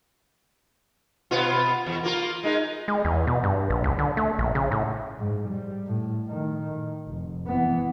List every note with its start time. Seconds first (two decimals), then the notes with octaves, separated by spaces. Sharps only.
1.31 B2 B3 F4
1.86 E2
2.03 A#3 F4 A#4
2.43 G#3 D#4 A#4
2.88 G#3
3.05 E2
3.27 B2
3.43 G2
3.70 A#1
3.84 C#2
3.99 D3
4.17 A3
4.39 A#1
4.55 C#3
4.72 A2
5.18 G#2
5.49 G3
5.87 A2
6.26 A2 D#3
7.07 F1
7.47 E3 B3